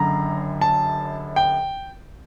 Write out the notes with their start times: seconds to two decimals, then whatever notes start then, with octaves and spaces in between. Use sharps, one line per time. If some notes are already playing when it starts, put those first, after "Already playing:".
Already playing: F#1 F#2 D3 A#5
0.61 A5
1.36 G5